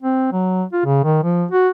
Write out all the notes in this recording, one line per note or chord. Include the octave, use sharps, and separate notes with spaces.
C4
F#3
F4
C#3
D#3
F3
F#4